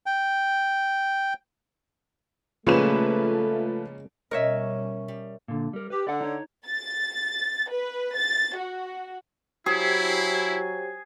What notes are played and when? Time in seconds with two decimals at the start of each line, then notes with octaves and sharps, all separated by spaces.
0.06 G5
2.67 A#2 C#3 F3 G#3 A3 C#4 B4 E7
4.31 B2 G3 C#4 A#4 C#5 D#5 E5
5.08 G3
5.48 A#2 D3
5.73 G3 A#4
5.90 G4 B4
6.07 D3 D5 F#5
6.21 D#4 C#5
6.68 A6
7.71 B4
8.18 A6
8.57 F#4
9.66 F#3 E4 G4 G#4 C5 G5